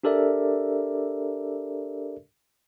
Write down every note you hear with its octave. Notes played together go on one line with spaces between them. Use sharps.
D4 G4 A4 A#4 D5 E5